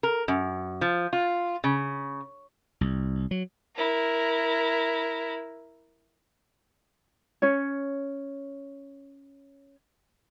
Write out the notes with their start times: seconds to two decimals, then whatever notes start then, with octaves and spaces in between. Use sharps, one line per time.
0.03 A#4
0.28 F#2
0.81 F3
1.13 F4
1.64 C#3
2.81 C2
3.31 F#3
3.76 E4 A#4
7.42 C#4 C#5